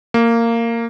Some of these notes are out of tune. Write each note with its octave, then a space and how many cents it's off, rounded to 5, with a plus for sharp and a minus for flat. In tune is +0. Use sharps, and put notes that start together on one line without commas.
A#3 -15